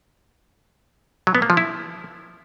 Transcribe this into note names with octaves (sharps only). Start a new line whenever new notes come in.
F#3
B3
A#3
F3
E4